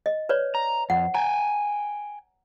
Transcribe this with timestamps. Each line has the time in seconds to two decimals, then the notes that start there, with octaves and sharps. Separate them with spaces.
0.06 D#5
0.29 B4 C#5 D5
0.55 A#5
0.90 F2 F#5
1.15 G5 G#5 A#5